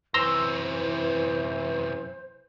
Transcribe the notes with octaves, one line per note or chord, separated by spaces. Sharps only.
F#2 C3 E3 C5 A#5 C6 E6